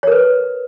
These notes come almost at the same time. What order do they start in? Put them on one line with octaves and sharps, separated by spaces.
C#5 A#4 B4